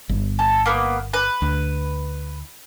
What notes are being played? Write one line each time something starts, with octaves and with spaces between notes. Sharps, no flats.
G1
A4
A#3 B3
B4
D2